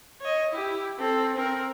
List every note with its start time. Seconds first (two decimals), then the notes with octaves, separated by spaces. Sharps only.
0.21 C#5 D#5
0.51 E4 G4
0.99 C4 A4
1.38 C4 A#4